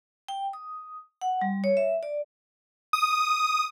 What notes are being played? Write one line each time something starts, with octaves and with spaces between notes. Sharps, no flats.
G5
D#6
F#5
G3
C#5
E5
D5
D#6